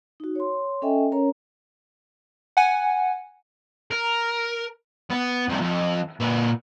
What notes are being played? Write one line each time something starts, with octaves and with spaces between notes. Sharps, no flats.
D#4 F#4
C#5 C6
C#4 A4 D#5 E5 G5 G#5
C#4 A#4 C#5 A#5
F#5 G#5
A#4
B3
C2 F2
F2
A#2 B4